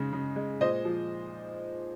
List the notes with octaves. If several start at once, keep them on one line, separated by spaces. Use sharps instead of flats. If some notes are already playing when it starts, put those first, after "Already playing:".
Already playing: C#3 G#3 D#4
C#3
G#3
A#2 C5 D#5
F3